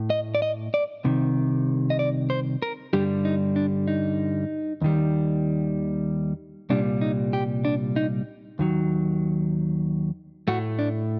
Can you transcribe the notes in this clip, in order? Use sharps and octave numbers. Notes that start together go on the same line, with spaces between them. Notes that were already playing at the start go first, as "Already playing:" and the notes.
Already playing: A2 A3
D#5
D5
D#5
D5
C2 C3 D#3
D#5
D5
C5
A#4
G2 D3 G3 G4
D#4
D4
D#4
D#2 D#3 G3
C2 A#2 G3 D4
D#4
G4
D4
D#4
D#2 D#3 F#3
A2 A3 F#4
D4